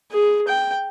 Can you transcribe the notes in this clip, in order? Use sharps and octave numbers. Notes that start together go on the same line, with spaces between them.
G#4
G5